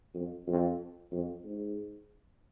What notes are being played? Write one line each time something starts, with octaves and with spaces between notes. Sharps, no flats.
F2
F2
F2
G#2